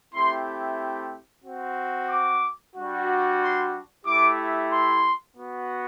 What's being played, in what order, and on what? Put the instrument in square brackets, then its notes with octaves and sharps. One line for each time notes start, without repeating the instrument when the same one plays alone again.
[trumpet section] A3 C4 E4 G4 C6
C4 F#4
D6
G3 D4 F#4
C6
A3 E4 G4 D6
C6
B3 F#4